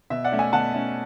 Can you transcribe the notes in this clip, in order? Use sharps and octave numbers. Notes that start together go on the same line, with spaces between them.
B2 E5
D5 F#5
A3 C#4
E5 G#5
B2 F#5 A5
A3 C#4